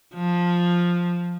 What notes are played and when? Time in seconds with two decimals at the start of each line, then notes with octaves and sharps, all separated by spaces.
0.14 F3